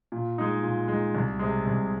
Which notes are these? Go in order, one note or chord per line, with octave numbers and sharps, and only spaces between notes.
A#2
G#3 D#4
A#2
G#3 D#4
C2
C3 G#3
C2